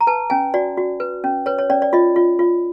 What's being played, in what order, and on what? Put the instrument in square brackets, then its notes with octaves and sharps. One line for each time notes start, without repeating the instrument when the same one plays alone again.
[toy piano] A#5
B4 A5
C#4 G#5
F#4 D5
F#4
B4
C#4
B4 C#5
C#5
C#4 D5
D5
F4 D#5
F4
F4